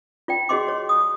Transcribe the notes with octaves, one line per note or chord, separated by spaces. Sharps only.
F4 D5 G5
F#4 G#4 C#5 D#5 C6 D6
C#5
D#6